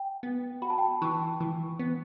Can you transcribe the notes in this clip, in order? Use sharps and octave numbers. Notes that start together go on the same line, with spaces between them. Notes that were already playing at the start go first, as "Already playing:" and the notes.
Already playing: G5
B3
F#4 B5
A5
G5
A5
E3 C#6
E3
B3